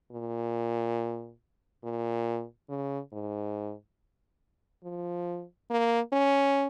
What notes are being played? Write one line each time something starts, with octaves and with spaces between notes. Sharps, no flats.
A#2
A#2
C#3
G#2
F3
A#3
C#4